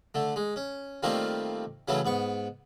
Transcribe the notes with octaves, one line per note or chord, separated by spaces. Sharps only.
D3 A3
G#3
C#4
D#3 G3 A3 A#3 C4 F4
C#3 E3 F#3 A3 C#4
G#2 B3 C#6